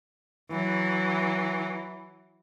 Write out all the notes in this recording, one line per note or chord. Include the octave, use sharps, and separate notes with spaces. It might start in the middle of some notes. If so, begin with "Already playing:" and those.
E3 F#3